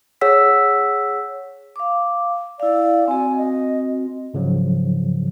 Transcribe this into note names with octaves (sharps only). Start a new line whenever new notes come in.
G#4 C#5 F#5 E6 B6
F5 D6
E4 D5 F5
C4 F#4 G#5
D#5
G#2 C#3 F3 F#3